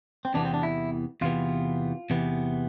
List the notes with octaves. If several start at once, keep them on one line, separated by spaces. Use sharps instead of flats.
C4
E2 C3 E3 B3 D4
C4
D4
E4
E2 C3 E3 B3 F4
E2 C3 E3 B3